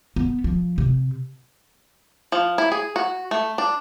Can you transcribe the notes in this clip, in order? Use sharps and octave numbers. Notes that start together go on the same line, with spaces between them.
B3
F3
C3
F3
E4
G#4
F#4
A3
D4